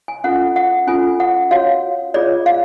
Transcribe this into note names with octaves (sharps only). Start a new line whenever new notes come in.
G#5
C#4 F4 A4 F#5
F#5
C#4 F4 A4 G#5
F#5
F#4 C#5 F5
F4 G#4 C#5 D5
F5